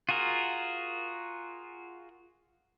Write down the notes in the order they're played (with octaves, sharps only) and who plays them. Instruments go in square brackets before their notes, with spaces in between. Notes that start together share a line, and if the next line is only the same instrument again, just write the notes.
[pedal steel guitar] F4 F#4 G#4 A#4